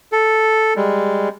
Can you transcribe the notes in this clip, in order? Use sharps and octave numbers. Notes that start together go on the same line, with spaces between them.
A4
G3 G#3